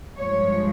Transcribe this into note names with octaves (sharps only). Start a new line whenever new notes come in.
G2 F3 G#3 C#5